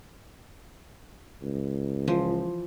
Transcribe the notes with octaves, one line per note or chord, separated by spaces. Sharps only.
C#2
E3 F3 C5